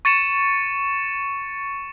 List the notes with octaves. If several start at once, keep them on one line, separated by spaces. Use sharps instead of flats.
C#6 A6 C#7 E7